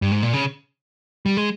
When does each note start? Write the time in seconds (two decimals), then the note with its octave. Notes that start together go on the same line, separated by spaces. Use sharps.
0.02 G2
0.11 G#2
0.23 A#2
0.33 C#3
1.26 G3
1.37 G#3